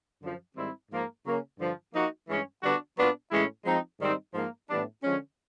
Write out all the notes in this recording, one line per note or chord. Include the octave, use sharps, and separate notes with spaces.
F#2 D3 F3
G#2 D#3 G3 C4 E4
G#2 F3 A#3
C#3 F#3 A#3 C#4
G2 D3 F3
F3 A#3 D#4 F#4
G2 E3 G#3 C#4
D3 G3 B3 D4 F#4
A#2 F#3 B3 D4 F4
A2 E3 G#3 C#4 E4
F3 G#3 C4 D#4
G#2 D#3 G3 C4 D#4
G#2 F3 A#3
A2 E3 G3 B3 D4
D3 F3 G#3 C#4